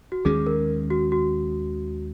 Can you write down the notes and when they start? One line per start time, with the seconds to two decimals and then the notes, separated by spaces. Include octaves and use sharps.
0.12 F#4
0.25 D#2 D#3 G#3 C#4 G#4
0.47 A#4
0.90 F#4
1.12 F#4